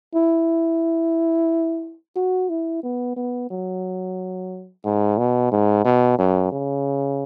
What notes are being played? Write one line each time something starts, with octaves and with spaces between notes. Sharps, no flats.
E4
F#4
E4
B3
B3
F#3
G#2
B2
G#2
B2
F#2
C#3